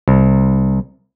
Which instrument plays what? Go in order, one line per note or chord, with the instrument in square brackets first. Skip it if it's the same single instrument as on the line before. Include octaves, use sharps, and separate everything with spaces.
[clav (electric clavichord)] C2